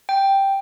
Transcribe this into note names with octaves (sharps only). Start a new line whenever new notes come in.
G5